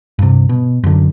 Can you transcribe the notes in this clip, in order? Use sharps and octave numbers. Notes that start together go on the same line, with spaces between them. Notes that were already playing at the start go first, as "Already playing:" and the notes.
G2 C3
B2
F#2 D3